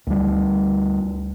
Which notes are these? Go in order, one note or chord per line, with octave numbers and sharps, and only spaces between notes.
D2 G3